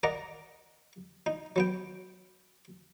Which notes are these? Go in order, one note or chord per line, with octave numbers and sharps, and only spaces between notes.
A#4 D5 D#5 F#5 A#5
D#4
F#3 B3 G5